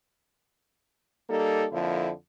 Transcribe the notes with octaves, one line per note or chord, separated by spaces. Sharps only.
G3 A#3 D#4 A4
F2 D3 F3 A#3 E4